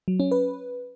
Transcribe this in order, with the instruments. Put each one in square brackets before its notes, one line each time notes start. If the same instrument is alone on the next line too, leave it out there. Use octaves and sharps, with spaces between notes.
[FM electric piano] F#3
C#4
B4